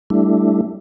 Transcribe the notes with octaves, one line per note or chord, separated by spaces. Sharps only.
G3 A3 D4 E4